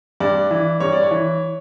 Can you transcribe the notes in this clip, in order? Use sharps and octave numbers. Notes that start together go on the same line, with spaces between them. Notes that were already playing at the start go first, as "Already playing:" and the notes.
G2 D5
E3
G2 C#5
D5
C#5
E3